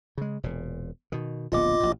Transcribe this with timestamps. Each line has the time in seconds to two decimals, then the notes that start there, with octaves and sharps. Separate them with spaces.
0.18 C#3 G#3
0.43 E1 A#2
1.12 B2 D#3
1.52 D1 A#1 B3 F4 D#5 D6
1.80 A1 A#2